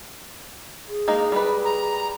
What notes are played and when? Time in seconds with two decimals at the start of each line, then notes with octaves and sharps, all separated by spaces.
0.88 G#4
1.08 G#3 A#3 D#4
1.32 G3 B4
1.65 A#5